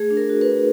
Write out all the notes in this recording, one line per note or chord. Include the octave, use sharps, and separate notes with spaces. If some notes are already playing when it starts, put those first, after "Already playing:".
Already playing: A3 G#4
D4
A#4
F#4
B4
A3